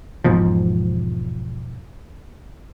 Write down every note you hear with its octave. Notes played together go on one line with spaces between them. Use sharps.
E1 G#2 B2 F3